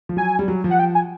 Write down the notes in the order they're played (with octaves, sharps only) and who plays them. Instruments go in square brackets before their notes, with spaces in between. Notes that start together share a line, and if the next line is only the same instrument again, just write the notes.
[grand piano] F3
[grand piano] F#3 [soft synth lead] G#5
[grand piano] G3
F#3
F3
[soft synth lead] F#5
G5
G#5